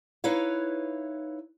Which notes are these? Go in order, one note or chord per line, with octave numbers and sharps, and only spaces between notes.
D#4 E4 B4 C#5 F5